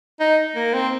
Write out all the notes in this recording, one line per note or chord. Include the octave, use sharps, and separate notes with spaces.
D#4
A#3
C4